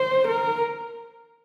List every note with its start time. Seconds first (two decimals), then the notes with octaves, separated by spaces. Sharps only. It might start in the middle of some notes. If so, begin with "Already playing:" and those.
Already playing: C5
0.28 A#4